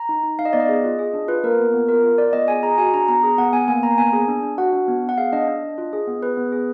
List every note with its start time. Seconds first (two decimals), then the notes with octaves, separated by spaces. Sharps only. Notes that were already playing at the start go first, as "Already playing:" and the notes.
Already playing: A#5
0.09 D#4
0.23 D#4
0.39 D#4 F5
0.45 D#5
0.53 B3 D5
0.60 D#5
0.69 G#4
0.84 F4
0.99 G#4
1.14 D4
1.28 F4 B4
1.44 A#3 A#4
1.58 B3
1.73 B3
1.88 F4 A#4
2.03 F4
2.18 F4 D5
2.33 B3 D#5
2.48 G#4 G#5
2.63 G#4 A#5
2.78 F#4 G#5
2.93 D4 A#5
3.08 B3 A#5
3.23 G#4
3.38 B3 F#5
3.53 B3 G#5
3.68 A#3 G#5
3.83 A#3 A#5
3.98 B3 G#5
4.13 G#4
4.28 D4
4.43 D4
4.58 F#4 F#5
4.73 D4
4.88 B3
5.03 B3
5.09 F#5
5.18 G#4 F5
5.33 D4 D#5
5.48 D4
5.63 D4
5.78 F4
5.93 G#4
6.07 B3
6.22 G#4 B4
6.37 B3
6.52 G#4